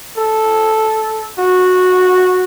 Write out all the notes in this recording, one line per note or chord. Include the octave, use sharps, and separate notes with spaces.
A4
F#4